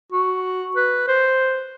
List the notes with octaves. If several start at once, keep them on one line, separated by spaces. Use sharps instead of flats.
F#4
B4
C5